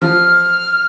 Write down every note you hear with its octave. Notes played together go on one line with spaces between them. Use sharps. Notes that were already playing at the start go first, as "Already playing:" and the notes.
F3 F6